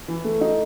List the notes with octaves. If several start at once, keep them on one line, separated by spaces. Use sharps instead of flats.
E3
A3
D#4